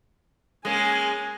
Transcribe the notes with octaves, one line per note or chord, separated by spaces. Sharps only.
G#3 A#3 C#4 G#5